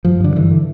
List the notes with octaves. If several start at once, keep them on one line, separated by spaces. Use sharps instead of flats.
G2 F3
G2 D3
D3 E3
D3